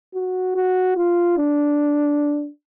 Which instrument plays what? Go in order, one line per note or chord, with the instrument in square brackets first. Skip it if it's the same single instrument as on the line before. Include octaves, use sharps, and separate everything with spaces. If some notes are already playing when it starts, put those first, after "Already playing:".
[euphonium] F#4
F#4
F4
D4